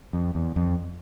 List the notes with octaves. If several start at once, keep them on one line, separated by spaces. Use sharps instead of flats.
F2
E2
F2